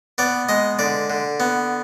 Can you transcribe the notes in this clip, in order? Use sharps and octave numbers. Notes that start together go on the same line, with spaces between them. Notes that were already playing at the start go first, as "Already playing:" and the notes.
B3 D5
G#3 D#5
D3 D5
D3
B3